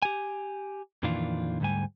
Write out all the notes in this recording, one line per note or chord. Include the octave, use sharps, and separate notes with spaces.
G4 G#5
F2 A#2 D#3 E3 D4 F4
D2 G#2 G3 G#5